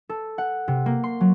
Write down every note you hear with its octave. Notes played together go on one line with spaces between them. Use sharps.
A4
F#5
C3
A#3
C6
F#3